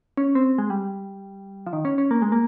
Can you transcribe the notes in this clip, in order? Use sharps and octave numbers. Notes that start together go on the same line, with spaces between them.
C#4
C4
G#3
G3
F3
D#3
C#4
C#4
A#3
G#3
A#3